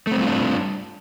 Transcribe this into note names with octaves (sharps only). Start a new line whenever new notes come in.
G3 A3 C4 D4 F4